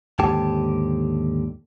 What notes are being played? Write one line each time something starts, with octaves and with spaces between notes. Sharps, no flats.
D#2 G#2 D3 G4 A5